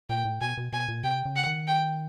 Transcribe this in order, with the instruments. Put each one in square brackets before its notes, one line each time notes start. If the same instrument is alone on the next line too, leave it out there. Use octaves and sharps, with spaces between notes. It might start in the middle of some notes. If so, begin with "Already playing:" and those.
[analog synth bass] A#2 [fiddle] G5
[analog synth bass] A2
[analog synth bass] B2 [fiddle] G#5
[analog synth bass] B2
[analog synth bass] B2 [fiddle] G#5
[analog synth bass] A#2
[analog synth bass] C3 [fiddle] G5
[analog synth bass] C#3
[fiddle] F#5
[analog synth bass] D#3
[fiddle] G5